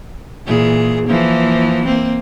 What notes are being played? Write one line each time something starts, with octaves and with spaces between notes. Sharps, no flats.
A#2 E3 G#4
E3 F3 A#3
A#3 C4